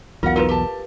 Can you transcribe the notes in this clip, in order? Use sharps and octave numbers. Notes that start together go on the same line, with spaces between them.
B1 E2 B2 F4 A#4 F5 F#5
D#4 F4 A#4 B4
G4 A5